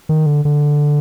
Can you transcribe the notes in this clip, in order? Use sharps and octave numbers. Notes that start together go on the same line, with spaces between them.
D#3
D3
D3